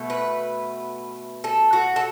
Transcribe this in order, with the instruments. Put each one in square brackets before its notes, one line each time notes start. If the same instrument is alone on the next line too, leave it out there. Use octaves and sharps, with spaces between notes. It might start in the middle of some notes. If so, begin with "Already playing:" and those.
Already playing: [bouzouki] B2 A3
B4
A4
F#4
A4